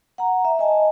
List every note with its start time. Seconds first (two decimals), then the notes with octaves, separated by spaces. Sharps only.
0.18 F#5 A#5
0.45 E5
0.59 D#5 G#5 A5